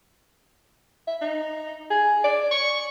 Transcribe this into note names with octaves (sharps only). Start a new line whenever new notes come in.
E5
D#4
G#4
D5
C#6